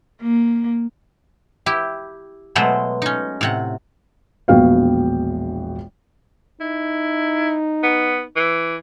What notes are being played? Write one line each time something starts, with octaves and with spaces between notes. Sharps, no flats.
A#3
E4 G4
B2 F#3 G#3 A3 C5 B5
C#4 D#4
A2 C3 F#5
E1 A#1 B3 F#4 F5 G5
D#4 E4
B3
E3